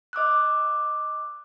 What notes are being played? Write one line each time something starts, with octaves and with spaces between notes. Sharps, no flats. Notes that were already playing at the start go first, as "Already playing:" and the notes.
D#5 D6 E6 F#6